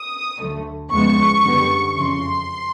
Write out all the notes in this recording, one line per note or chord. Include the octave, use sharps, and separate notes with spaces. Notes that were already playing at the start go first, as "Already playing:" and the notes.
Already playing: D#6
D2 D3 F#3 A3
E2 C#3 F3 G#3 B3 C#6
F#2 D3 G3 B3
F2 C#3 E3 C6